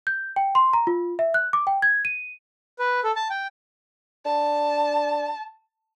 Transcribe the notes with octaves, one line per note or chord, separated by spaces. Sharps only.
G6
G5
C6
A#5
F4
E5
F#6
D6
G5
G#6
D#7
B4
A4
A5
G5
D4 A5